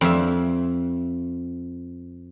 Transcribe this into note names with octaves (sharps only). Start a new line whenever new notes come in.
F2 E5